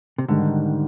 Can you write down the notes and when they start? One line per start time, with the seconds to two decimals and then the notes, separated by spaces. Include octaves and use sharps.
0.18 C3
0.28 G#2 D3 D#3 G3